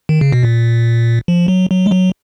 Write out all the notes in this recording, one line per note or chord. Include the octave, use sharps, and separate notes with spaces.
D#3
C#3
B2
A#2
F3
F#3
F#3
G#3
F#3